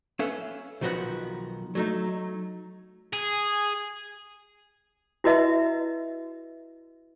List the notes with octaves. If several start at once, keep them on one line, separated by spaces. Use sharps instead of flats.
C#4 A4 B4 E5 F5
B1 D#3 F3 F#4 B4 F#5
F#3 A3 D#4
G#4
E4 F#4 B4 D#5 E5